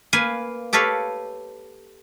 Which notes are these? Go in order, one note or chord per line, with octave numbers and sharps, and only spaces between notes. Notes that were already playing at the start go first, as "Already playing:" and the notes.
A#3 B4 F5 G#5
G4 A4 B4 C#5 F5